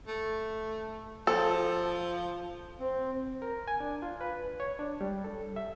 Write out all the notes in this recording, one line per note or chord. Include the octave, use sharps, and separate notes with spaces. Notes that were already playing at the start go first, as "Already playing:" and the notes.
A3
F3 A4
C4
A#4
G#5
D4
F4
B4
C#5
D4
G3
A4
E5